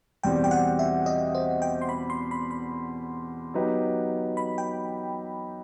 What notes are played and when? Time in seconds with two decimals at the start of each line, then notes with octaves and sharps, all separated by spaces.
0.23 E2 B2 G3 C4 G5
0.44 G5
0.51 F#5
0.79 E5
1.06 D#5
1.35 C5
1.62 G5
1.82 C6
1.89 B5
2.10 C6
2.31 B5
2.51 B5
3.54 F#3 B3 D#4 G4 B4
4.37 B5
4.58 G5